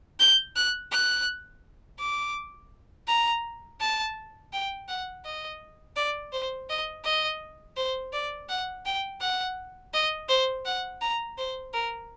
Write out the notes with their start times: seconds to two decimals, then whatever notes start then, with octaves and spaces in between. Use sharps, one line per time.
0.20 G6
0.56 F#6
0.92 F#6
2.00 D6
3.08 A#5
3.81 A5
4.53 G5
4.88 F#5
5.25 D#5
5.96 D5
6.33 C5
6.69 D#5
7.05 D#5
7.77 C5
8.13 D5
8.49 F#5
8.86 G5
9.21 F#5
9.94 D#5
10.29 C5
10.65 F#5
11.01 A#5
11.38 C5
11.73 A#4